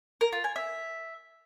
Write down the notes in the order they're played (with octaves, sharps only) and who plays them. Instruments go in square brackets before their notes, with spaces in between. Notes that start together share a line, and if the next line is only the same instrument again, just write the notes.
[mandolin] A#4
F4
G#5
E5